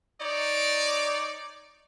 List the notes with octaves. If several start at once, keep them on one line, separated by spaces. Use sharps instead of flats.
D#4 C#5 D5